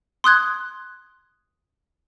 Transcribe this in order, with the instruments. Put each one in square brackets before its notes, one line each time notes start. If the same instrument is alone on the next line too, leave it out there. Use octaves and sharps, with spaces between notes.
[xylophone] C6 D#6 F#6 G#6